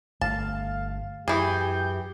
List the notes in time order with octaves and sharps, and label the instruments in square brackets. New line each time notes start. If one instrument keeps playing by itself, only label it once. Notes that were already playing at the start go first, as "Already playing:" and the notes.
[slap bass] G1 A3 [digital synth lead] F5 [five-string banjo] A5
[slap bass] F#2 [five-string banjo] E3 G#4 [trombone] G4 [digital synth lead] G6